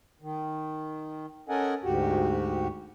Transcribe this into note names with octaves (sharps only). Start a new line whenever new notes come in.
D#3
C#4 A4 A#4 D#5 F#5 G#5
D2 G#2 F#4 G4